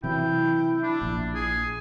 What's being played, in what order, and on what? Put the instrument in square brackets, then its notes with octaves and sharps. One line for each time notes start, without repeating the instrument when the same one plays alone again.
[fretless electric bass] C3 E3 F#3 [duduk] E4 [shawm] G5
[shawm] D4
[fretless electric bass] A#1
[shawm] G#4